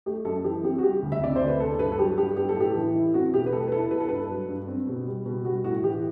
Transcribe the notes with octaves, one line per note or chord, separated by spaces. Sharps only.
A3 G4
F#2 A4
E3 G4
C4 G4
F#4
G3 G4
D2
E5
C3 D5
D2 C5
B4
B3 A4
A4
G2 B4
A4
F#3 G4
G2 G4
B3 G4
A4
A2 G4
E3
E4
C4 F#4
B2 G4
B4
A3 A4
B4
E4 A4
B3 B4
A4
G2 B4
F#3
G2
C4
B2
G3
B2
G3 F#4
A2 F#4
E3 G4